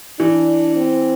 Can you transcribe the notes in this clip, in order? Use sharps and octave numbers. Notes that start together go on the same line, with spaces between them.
E3 D4
C4